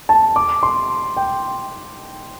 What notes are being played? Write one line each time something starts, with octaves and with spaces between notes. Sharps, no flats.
A5
D6
C6
G5